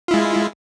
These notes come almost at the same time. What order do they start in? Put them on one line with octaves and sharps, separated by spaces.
F4 E4 G#3